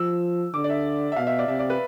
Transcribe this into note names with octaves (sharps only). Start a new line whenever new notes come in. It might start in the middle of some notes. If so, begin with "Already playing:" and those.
Already playing: F3 E6
D3 D6
D5
E5
E5
B2 F5
E5
D5
C3 E5
D5
B4